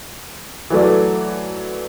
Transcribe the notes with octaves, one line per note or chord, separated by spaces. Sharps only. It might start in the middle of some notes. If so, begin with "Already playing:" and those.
E3 F#3 A3 D5